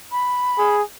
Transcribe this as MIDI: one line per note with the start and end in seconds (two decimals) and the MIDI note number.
0.12 0.75 83
0.58 0.82 68